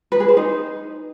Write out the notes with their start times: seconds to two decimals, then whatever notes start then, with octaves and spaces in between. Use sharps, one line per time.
0.12 B4
0.20 G#4
0.28 C5
0.37 D#4